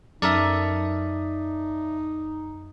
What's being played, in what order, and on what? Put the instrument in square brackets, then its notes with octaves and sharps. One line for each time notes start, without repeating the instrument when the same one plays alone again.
[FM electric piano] F#2 [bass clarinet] D#4 [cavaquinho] A4 A#4 D#6 [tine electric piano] D5 E5